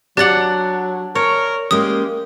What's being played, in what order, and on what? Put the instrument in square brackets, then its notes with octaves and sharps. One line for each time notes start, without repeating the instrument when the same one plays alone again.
[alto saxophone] F#3 [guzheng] D4 F#5 [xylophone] G4 A6
[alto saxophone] A#4 [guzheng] C#5
[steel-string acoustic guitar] G#3 A#3 C#4 [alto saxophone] G4 [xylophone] D#6